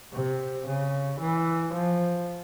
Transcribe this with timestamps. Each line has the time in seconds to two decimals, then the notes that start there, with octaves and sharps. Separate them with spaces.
0.13 C3
0.66 C#3
1.20 E3
1.73 F3